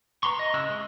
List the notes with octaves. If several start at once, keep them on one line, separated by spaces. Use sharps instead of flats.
B4 A#5 C6 C#6
D#5
C#3 E4 C#6 E6 F#6
G#3